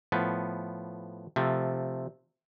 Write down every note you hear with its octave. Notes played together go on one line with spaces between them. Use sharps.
A2 F3 B3
C3 F3 A3